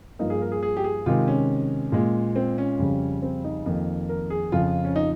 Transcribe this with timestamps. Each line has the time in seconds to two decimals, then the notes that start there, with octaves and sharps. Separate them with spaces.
0.19 G2 F3 A#3 D#4
0.30 G#4
0.41 A#4
0.52 G#4
0.63 G#4
0.77 G4
0.84 G#4
1.06 C3 D#3 G#3 F4
1.28 C#4
1.92 A#2 G#3
2.36 C4
2.58 C#4
2.79 F2 C#3 G3
3.22 C4
3.44 D#4
3.66 F2 D#3 A#3
4.09 A#4
4.30 G#4
4.52 F2 C#3 F3 F4
4.85 C#4
4.96 D#4